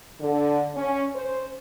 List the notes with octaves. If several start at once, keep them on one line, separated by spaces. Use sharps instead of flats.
D3
C#4
C5